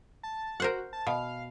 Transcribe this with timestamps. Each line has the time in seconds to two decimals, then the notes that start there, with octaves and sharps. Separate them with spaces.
0.23 A5
0.60 F#4 A#4 C5 F#5
0.93 A5
1.07 B2 F5